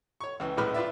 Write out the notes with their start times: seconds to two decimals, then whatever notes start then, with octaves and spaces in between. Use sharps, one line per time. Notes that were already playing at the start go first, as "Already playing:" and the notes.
0.20 C#5 C#6
0.40 C#2 E3
0.57 A#1 A2 G#3 B4 B5 F6
0.74 F4 B4 D5 E5